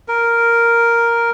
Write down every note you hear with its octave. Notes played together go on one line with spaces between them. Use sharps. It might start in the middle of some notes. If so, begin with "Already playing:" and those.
A#4